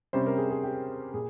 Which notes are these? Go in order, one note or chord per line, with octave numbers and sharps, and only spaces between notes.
C3 G3 C#4 C5
A#4
G#4
G#4
G4
A#2 G#4